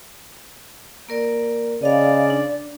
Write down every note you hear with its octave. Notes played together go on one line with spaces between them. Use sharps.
A#3 A#4 D5
C#3 D5 D#5 F5
D4